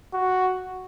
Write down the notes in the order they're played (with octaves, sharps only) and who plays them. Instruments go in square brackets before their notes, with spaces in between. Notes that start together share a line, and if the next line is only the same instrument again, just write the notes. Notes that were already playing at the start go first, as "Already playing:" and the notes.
[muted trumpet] F#4